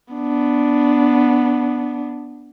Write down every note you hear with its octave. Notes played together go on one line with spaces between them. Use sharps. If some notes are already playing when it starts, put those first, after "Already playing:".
B3 D4